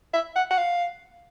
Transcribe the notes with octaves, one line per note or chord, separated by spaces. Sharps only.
E5
F#5
F#5
F5